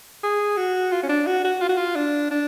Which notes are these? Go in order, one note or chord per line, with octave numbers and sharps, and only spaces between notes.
G#4
F#4
F4
C#4
D4
F#4
F#4
F4
F#4
F4
D4
D4